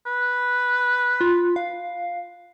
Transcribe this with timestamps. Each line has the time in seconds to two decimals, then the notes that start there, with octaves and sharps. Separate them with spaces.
0.06 B4
1.21 F4
1.56 F5